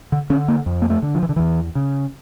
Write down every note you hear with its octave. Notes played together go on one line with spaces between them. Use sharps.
D3
D3 C#4
A#3
F2
A#3
A3
D3
F3
E3
D3
E2 E3
C#3